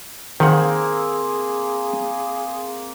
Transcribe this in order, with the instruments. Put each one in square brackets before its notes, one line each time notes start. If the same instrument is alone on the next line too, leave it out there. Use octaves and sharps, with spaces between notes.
[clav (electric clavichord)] D#3 F#5 [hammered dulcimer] A#3 C4 [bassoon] G#4